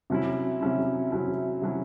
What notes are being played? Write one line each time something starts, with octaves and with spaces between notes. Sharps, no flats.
C3 F#3 C#4 E4
C3 F#3 C#4 E4
C3 F#3 C#4 E4
C3 F#3 C#4 E4